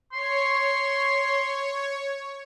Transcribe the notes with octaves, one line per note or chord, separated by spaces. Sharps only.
C#5 C6